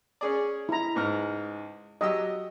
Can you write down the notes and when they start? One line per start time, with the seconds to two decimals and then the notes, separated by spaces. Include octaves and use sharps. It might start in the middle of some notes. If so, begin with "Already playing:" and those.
0.21 C#4 G#4 D5
0.69 E4 A#5
0.95 C#2 G#2 F6
2.01 F#3 G4 D#5 E6